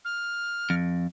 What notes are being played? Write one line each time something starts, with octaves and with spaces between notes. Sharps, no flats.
F6
F2